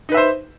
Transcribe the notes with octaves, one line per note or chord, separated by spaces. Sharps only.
D#4 B4 C5 E5